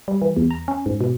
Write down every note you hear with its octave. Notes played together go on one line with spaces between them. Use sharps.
G3
E3
E2
A#5
C#4
G#2
B2